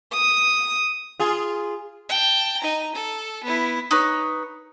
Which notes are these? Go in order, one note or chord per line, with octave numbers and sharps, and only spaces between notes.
D#6
F4 G#4
G5 A5
D#4 A#5
A4
B3 E4
D#4 B4 C#5